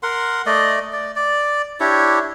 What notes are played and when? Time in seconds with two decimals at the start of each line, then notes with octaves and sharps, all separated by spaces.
0.03 A#4 F#5 C6
0.46 A3 D5 D#5
0.93 D5
1.16 D5
1.80 D4 E4 G4 C#5